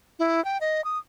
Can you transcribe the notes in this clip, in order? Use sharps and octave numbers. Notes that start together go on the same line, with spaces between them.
E4
G5
D#5
D#6